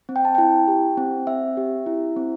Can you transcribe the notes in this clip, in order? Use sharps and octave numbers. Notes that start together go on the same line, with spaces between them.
C4
G5
A5
E4 G5
G4
C4
C4 E5
G4
E4
C4